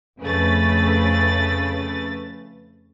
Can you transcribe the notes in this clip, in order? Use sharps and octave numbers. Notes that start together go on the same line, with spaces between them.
F2 C#3 A3 B4 A6